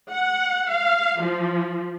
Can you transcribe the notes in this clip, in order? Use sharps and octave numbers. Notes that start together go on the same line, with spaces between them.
F#5
F5
F3